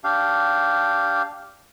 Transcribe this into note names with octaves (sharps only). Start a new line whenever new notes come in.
D4 G4 F5